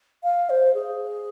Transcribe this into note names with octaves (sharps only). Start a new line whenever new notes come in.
F5
C5
G#4